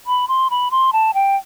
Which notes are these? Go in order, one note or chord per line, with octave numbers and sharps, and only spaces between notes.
B5
C6
B5
C6
A5
G5